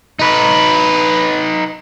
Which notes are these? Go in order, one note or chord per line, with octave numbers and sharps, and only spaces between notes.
D#4 B4